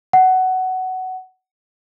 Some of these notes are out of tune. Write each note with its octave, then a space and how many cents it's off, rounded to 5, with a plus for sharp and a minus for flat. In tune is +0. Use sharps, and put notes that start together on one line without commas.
F#5 +15